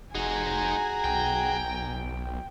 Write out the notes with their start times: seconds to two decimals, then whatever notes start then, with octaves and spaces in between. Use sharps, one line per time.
0.15 F1 D#4 F#4 G#4 C5 G#5 A#5
1.04 B1 G5